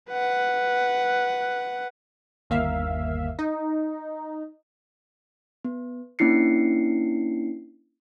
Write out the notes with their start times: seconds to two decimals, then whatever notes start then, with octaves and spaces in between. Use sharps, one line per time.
0.11 B4 F#5
2.50 G1 D#2 A#3 E5 F5
3.39 D#4
5.65 B3
6.19 A#3 C#4 D4 E4 C7 C#7